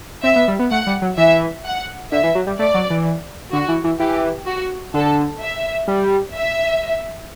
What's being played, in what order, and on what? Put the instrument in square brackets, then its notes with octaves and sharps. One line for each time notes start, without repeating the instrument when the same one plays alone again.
[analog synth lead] C4 [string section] E5
[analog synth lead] B3
G3
B3
[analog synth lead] A3 [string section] F#5
[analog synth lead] G3
F#3
[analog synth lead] E3 [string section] E5
[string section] F#5
[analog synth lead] D3 [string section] E5
[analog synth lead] E3
F#3
G3
[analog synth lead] A3 [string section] D5
[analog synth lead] F#3
E3
[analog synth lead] D3 [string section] F#4
[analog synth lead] E3
E3
[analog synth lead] E3 [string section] G4
[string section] F#4
[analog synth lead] D3 [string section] A4
[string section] E5
[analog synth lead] G3
[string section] E5